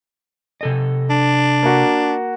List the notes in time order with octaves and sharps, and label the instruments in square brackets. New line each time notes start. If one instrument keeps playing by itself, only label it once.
[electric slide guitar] C3 A4 D#5
[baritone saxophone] D4
[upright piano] A#3 F#4